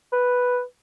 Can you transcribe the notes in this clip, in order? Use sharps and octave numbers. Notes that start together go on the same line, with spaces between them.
B4